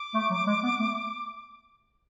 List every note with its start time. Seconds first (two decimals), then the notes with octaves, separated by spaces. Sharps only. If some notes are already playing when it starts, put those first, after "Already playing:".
Already playing: D6
0.14 A3
0.31 F#3
0.47 G#3
0.63 B3
0.80 A3